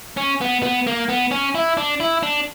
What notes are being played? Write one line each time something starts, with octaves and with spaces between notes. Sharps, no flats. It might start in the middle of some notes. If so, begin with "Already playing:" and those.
C#4
B3
B3
A#3
B3
C#4
E4
D4
E4
D4